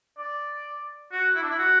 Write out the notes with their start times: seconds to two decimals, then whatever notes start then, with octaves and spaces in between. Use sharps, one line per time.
0.18 D5
1.12 F#4
1.35 E4
1.43 D4
1.50 E4
1.59 F#4